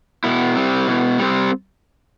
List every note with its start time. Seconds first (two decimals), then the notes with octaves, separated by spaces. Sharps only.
0.24 B2 E4
0.56 G3 C4
0.87 B2
1.18 G3 C4